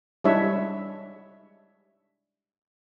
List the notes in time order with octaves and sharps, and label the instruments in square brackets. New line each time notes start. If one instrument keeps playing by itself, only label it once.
[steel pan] G3 G#3 D4 E4 C#5 E5